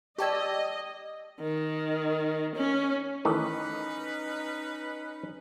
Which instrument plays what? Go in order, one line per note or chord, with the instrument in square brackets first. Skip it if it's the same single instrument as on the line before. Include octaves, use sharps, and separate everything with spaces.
[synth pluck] G4 A5 E6 [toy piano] D5 G5 C#6 [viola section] D#5
[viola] D#3
C#4
[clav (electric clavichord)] D#3 E3 A3 [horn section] C#4 D#4 B4